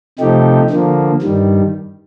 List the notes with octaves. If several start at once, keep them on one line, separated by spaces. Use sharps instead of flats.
C3 F3 A3 D#4 G4
D3 F3 A#3
G2 D#3 G3